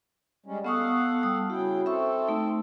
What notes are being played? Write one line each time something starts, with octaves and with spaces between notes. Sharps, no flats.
G3 G#3 C#4
B3 A4 F5 F#5 C#6 D#6
G3 D#6
C#3 E4 F#4 G5
C4 A4 E5 C#6
A3 D#4